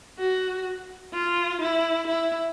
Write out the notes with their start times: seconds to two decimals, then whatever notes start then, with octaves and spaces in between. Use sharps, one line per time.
0.19 F#4
1.14 F4
1.61 E4
2.07 E4